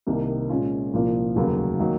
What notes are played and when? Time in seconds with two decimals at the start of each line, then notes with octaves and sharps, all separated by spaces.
0.07 C2 C3 D#3 A#3
0.49 A#2 G#3 C#4 F4
0.93 C2 A#2 F3 A#3
1.36 F1 D#2 C#3 F#3 A#3
1.79 D#3 F#3 A#3